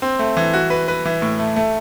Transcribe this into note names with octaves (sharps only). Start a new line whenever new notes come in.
C4
A3
E3
F#4
B4
B4
E3
A2
A3
A3